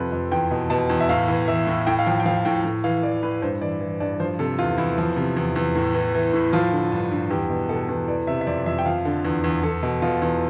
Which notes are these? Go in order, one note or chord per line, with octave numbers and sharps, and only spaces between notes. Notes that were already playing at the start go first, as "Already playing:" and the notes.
Already playing: F2 C3 F3 A4 B4
F2
E2 G5
B2
B2 A5
E2
E5
A2 F5
E3
E3 E5
A2
A2 G5
F5
F3 G5
G5
F3 F5
A2 G5
A2
E3 F5
E3 D5
A2 B4
G2 C5
E3 D5
E3
G2 D5
F3 C5
C3 A4
E2 F4
E2 E4
F3
C3
E2
E2
A2
E3
E3
A2
F3 F4
D3
G2
G2
E2 G4
B2
B2 A4
E2
E3 D5
C3 E5
E5
F2 D5
F2 E5
G5
F3 F5
D3
E2
E2
E2 A4
B2
B2 F4
E2